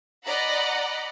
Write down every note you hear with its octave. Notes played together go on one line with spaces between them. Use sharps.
D5 D#5 F#5 A#5 B5